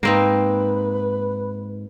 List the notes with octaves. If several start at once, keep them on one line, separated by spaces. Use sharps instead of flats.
G#2 A#3 C4 D#4 B4